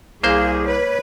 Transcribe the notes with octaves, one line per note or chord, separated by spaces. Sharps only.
C2 A#3 G#4 C5 F5
B4 C#5